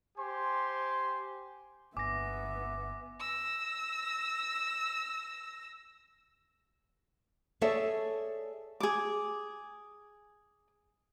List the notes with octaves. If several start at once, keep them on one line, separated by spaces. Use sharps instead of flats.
G4 C5 G#5 C6
G1 B3 E5 G#5 D6 A#6
E6 A#6
G#4 A4 C#5 D5 E5
G#4 D6